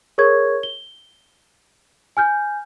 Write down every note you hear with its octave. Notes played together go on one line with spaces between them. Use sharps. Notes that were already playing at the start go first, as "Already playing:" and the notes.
G#4 A#4 C#5 C#6 G#6
G7
G#5 F6 G6